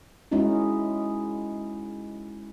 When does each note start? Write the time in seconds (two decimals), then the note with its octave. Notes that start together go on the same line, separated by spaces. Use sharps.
0.32 G#3 C#4 D#4 E4 F#4